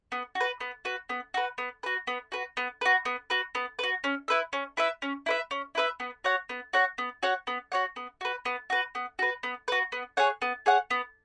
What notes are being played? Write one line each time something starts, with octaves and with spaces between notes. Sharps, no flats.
B3
F#4
B4
B3
F#4 B4
B3
F#4 B4
B3
F#4 B4
B3
F#4 B4
B3
F#4 B4
B3
F#4 B4
B3
F#4 B4
C#4
E4 B4 E5
C#4
E4 B4 E5
C#4
E4 B4 E5
C#4
E4 B4 E5
B3
F#4 C#5 F#5
B3
F#4 C#5 F#5
B3
F#4 C#5 F#5
B3
F#4 C#5 F#5
B3
F#4 B4
B3
F#4 B4
B3
F#4 B4
B3
F#4 B4
B3
G#4 C#5 F#5
B3
G#4 C#5 F#5
B3